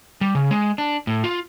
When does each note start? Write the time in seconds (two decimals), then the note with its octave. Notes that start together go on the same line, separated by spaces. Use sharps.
0.21 G3
0.35 C#3
0.51 G#3
0.78 D4
1.07 A2
1.24 F4